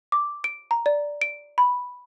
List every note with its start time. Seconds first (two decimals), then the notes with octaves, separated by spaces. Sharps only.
0.12 D6
0.44 D7
0.71 A#5
0.86 D5
1.21 D7
1.58 B5